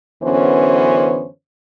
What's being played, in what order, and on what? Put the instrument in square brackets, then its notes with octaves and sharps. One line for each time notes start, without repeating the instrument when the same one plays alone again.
[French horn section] F#2 D3 E3 B3 C#4 C5